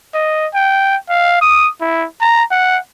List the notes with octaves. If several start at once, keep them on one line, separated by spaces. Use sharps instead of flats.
D#5
G5
F5
D#6
E4
A#5
F#5